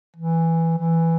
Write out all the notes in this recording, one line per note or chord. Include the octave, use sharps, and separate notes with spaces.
E3
E3